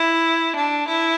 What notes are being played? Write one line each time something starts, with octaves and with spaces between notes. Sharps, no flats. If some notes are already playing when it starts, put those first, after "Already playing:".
Already playing: E4
D4
E4